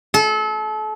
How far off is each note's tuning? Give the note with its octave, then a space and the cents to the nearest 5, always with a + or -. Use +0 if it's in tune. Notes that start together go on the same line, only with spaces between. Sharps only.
A4 -35